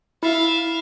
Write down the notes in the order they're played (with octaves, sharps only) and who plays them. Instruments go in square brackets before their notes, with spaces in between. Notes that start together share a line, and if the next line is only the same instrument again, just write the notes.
[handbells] E4 [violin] E5 F5